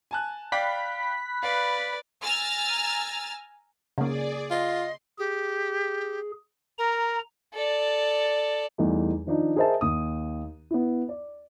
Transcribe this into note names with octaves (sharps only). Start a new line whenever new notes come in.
G#5 A5 F#6
D5 F5 G5 B5 F#6 B6
B4 D5 F5
G#5 A#5 E6 F6 A6
C#3 A#3 G#4 D5
F4 D#5 C6
G4 G#4
A#4 A#5
A4 D5
E2 E3 G3 A3 D#4
D#3 F3 D4 D#4
G#4 A#4 C5 D#5 E5 A5
D#2 D#6
B3 E4
D5